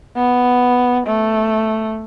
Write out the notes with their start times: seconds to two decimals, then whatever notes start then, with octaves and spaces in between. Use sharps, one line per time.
0.16 B3
1.07 A3